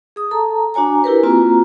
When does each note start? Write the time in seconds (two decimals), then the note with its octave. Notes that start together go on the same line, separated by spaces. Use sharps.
0.16 G#4 D#6
0.31 A4 A5 A#5
0.74 D4 F#4 C#5 G#5 A#5
1.04 E4 G4 A#4 B4
1.23 A#3 C4 F4 F#4 A#5